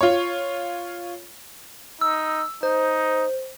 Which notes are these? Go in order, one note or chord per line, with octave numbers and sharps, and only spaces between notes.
F4 C#5
D#4 E6
D#4 C5